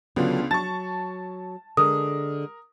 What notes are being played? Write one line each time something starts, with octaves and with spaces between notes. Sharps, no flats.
C#2 D3 F#3 B3 D4 F4
F#3 A5 C#6 A6
D3 G#3 A#4 D#6